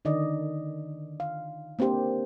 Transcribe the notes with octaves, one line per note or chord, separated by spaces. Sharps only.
D3 D#3 D5 D#5
F5
A#3 C4 D4 G4 C5